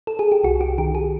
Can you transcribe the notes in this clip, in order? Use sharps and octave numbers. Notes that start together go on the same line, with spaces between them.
A4
G#4
G4
C2 F#4
G4
D#3 G4
G#4